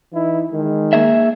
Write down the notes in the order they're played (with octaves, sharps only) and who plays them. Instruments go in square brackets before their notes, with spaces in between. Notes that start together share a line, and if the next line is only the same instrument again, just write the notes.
[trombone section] E3 D#4 E4
D#3 G#3
[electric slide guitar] A#3 G#4 E5